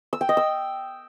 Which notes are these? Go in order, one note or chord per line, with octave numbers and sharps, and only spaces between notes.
E6
G5
D#5
E6